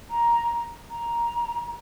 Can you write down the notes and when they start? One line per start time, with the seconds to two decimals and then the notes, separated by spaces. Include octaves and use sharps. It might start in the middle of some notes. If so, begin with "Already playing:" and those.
0.10 A#5
0.90 A#5